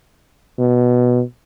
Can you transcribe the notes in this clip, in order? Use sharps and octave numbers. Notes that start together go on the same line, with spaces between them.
B2